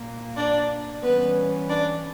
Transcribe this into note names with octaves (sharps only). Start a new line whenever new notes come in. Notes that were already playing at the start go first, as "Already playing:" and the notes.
Already playing: A#2 A#3
D4 D5
E3 G3 B3 C#4 B4
D4 D5